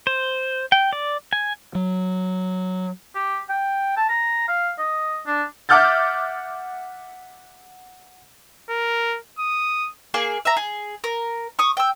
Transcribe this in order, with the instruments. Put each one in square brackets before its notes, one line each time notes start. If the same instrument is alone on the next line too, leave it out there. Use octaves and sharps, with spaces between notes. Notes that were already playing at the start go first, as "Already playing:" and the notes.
[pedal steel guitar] C5
G5
D5
G#5
[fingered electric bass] F#3
[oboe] G4
G5
A5
A#5
F5
D#5
D4
[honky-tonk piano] E5 F#5 D6 F6 G6 A6
[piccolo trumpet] A#4
D#6
[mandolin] A#3 G#4 G#5
E5 A#5
G#4
A#4
C#6 D#6
G5 E6